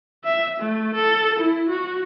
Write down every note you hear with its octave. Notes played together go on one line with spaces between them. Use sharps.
E5
A3
A4
E4
F#4